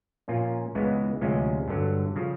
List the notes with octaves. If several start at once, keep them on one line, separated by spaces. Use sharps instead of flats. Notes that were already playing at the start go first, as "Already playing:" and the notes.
A#2 F3 A#3 C#4 F4
C#2 C#3 E3 G#3 B3
D2 C3 F3 G#3 C#4
G2 D3 F#3
C#3 F3